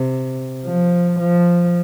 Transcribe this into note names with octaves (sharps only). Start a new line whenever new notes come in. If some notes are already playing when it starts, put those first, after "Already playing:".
Already playing: C3
F3
F3